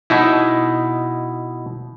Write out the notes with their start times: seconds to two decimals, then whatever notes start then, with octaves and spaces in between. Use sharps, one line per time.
0.10 B2 D#4 E4